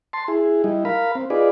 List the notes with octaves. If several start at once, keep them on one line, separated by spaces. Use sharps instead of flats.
A5 C6
E4 G#4
G3 D#4 E4
A#4 F5 B5
C4
D#4 F4 G#4 B4 D5